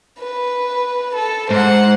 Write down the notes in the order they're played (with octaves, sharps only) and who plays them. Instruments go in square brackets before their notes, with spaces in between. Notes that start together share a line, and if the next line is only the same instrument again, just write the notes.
[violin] B4
A4
[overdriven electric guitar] G#2 [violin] C5 F#5